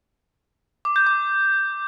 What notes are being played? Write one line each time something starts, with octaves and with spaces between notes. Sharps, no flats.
D6
G6
D6